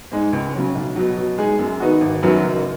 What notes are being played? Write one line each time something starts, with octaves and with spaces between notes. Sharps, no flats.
G#2 G#3 D#4
C#2
C#3 F#3 C#4
B1
B2 F#3
B2
G#3 D#4 G#4
F#2
D#3 B3 D#4 F#4
G#1
F#2 D#3 F#3 B3
F#1